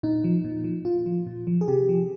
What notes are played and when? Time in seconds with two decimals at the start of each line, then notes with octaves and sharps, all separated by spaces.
0.03 A#2 D#4
0.24 F3
0.44 A#2
0.64 F3
0.85 A#2 F4
1.06 F3
1.27 A#2
1.47 F3
1.61 G#4
1.68 C3 G4
1.89 F3